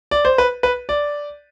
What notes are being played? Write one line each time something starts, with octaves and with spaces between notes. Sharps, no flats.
D5
C5
B4
B4
D5